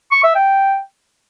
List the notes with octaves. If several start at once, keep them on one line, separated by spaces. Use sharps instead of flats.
C#6
E5
G5